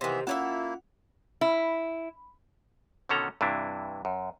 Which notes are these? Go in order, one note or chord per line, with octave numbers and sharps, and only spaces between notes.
C3 D#3 E3 B3 E5 C6
A#3 C#4 E4 F4 A4 C#5 E5 F#5
E4
B2 D3 D#3 C#4 A4 A#5
G2 C3 E3 D4 E4
F#2